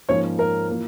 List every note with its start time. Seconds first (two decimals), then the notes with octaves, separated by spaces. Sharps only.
0.09 G#2 F3 A#3 C#4 C#5
0.39 A#4
0.70 E3 A#3 F4